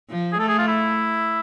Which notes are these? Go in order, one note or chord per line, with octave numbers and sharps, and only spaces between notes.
F3
G#4
A3 A4
G#4
F4
E4